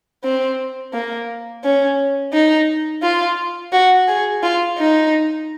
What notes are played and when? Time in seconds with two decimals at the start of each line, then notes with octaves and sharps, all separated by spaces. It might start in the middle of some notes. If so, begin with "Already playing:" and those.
0.24 C4
0.94 A#3
1.64 C#4
2.33 D#4
3.03 F4
3.72 F#4
4.08 G#4
4.43 F4
4.78 D#4